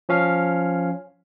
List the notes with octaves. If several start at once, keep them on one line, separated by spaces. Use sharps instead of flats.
F3 C#4 F5